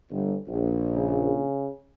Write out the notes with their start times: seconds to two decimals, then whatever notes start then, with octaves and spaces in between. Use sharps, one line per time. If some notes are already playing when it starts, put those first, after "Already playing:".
0.11 G1
0.48 A#1
0.95 C#3